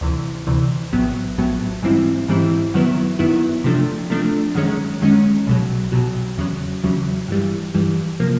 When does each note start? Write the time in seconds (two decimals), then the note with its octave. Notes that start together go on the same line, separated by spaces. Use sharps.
0.01 D2 C3 E3
0.47 D2 C3 E3
0.92 A#1 A2 F#3 B3
1.38 A#1 A2 F#3 B3
1.83 G#2 E3 G3 C4 E4
2.29 G#2 E3 G3 C4 E4
2.74 F#2 D#3 F#3 B3 E4
3.19 F#2 D#3 F#3 B3 E4
3.64 C3 F3 A3 D4
4.10 C3 F3 A3 D4
4.55 F#2 D#3 G#3 C#4
5.02 F#2 D#3 G#3 C#4
5.47 B1 B2 F#3
5.92 B1 B2 F#3
6.38 E2 C#3 F#3
6.84 E2 C#3 F#3
7.28 G2 E3 G3
7.74 G2 E3 G3
8.20 C3 F3 A#3